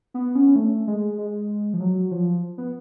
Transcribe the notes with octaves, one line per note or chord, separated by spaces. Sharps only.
B3
C#4
A3
G#3
G#3
F3
F#3
F3
B3